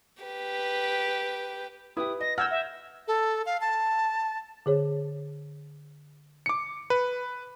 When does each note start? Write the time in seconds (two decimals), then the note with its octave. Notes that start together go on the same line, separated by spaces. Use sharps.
0.23 G4 B4
1.97 E4 G4 B4 D#6
2.20 D#5 A#6
2.38 F#5 E6 F6 G6 G#6 A#6
2.51 E5
3.08 A4
3.46 F5
3.61 A5
4.66 D3 G#4 C#5
6.46 D6 C#7
6.90 B4